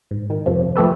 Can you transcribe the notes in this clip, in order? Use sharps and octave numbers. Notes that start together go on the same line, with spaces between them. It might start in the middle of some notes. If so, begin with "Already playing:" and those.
G#2
D#3
F2 C3 F3
F3 A3 G4 A4 B4